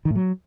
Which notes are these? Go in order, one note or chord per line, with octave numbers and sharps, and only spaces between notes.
D#3
A2
F#3